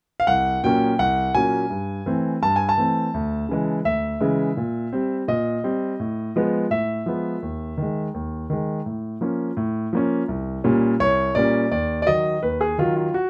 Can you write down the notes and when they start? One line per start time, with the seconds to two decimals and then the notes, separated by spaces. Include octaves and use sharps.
0.20 F5
0.27 C2 F#5
0.64 A#2 F#3 A#3 C#4 G5
0.99 C2 F#5
1.35 A#2 F#3 A#3 C#4 G#5
1.70 G2
2.06 E3 A3 C4
2.43 G2 A5
2.56 G#5
2.69 A5
2.78 E3 A3 C4
3.14 D2
3.49 C#3 E3 G#3
3.85 D2 E5
4.20 C#3 E3 G#3
4.57 A#2
4.93 G3 C4
5.28 A#2 D#5
5.64 G3 C4
6.00 A2
6.36 F3 G#3 B3
6.70 A2 E5
7.06 F3 G#3 B3
7.42 D#2
7.78 D#3 G#3
8.14 D#2
8.50 D#3 G#3
8.86 A2
9.21 F3 A#3 C#4
9.57 A2
9.93 F3 A#3 C#4
10.28 C2
10.64 A#2 G3 A#3 C#4
11.00 C2 C#5
11.35 A#2 G3 A#3 C#4 D5
11.71 D#2 D5
12.02 D5
12.06 D#3 F#3 D#5
12.43 D#2 B4
12.61 G#4
12.78 D#3 F#3 F4
12.96 F4
13.14 F#4